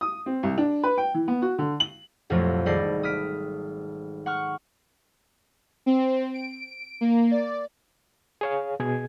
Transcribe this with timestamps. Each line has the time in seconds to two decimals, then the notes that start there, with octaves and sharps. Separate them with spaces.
0.01 D#6
0.26 C4
0.43 C2
0.58 D4
0.83 B4
0.98 G5
1.14 E3
1.28 B3
1.42 F#4
1.58 D3
1.80 F#7
2.30 C2 F2 A#2 F3 F#3 A3
2.66 G#1 G3 A4 D5 D#5 C7
3.03 D#6 F6 B6 D7
4.26 F#5 C#6 F6
5.86 C4
6.34 D7
7.01 A#3
7.31 D5
8.41 G#4 C#5 F5
8.80 B2 G#4 G#6